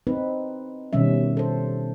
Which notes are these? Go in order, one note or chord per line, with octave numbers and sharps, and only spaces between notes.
C4 D#4 B4
B2 D#3 G3 C#4 E5
A4 C5